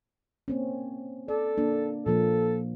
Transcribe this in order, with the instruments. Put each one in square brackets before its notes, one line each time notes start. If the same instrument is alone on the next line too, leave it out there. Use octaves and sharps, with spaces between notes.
[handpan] A#3 C4 C#4
[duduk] A4 [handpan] D5
[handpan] A#3 D4
[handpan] A#2 F3 A#3 [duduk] A4